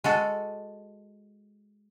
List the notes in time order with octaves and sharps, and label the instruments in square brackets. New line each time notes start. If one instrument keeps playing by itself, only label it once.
[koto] G#3 F#4 A4